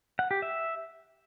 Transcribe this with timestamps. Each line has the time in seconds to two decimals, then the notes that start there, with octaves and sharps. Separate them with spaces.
0.19 F#5
0.31 G4
0.42 E5